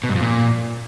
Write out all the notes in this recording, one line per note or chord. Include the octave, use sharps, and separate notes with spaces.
B2
G2
F2
A#2